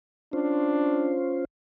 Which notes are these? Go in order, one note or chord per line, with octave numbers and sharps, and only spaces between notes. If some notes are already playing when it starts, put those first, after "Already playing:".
C#4 D4 F4 C5